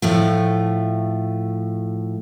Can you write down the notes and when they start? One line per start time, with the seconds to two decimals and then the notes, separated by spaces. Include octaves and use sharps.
0.02 A2 F3 A3